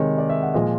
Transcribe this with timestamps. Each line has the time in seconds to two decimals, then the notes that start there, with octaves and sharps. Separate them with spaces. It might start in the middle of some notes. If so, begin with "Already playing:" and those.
Already playing: C3 D#3 G#3 C#5
0.18 D5
0.29 E5
0.43 F#5
0.54 A#2 F3 G#3 D#5